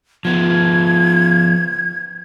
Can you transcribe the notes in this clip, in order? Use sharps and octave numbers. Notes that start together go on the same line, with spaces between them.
F3 B3 G#6